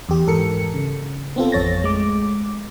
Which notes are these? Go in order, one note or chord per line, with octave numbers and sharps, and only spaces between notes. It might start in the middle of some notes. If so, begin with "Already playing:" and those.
E2 G4
G#2 E3 A4 A#4 C#7
C#3
B3 C4 F4 A4
A1 F2 C#5 A6 A#6
G#3 A3 D6